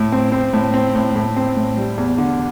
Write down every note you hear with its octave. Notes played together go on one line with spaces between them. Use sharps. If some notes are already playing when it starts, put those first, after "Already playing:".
Already playing: A2
C4
C4
A2
C4
A2
A2
C4
A2
G3
E2
D3